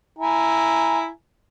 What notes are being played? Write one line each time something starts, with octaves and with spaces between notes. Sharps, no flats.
E4 G#5 A#5